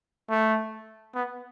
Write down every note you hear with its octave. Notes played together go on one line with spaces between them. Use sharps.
A3
B3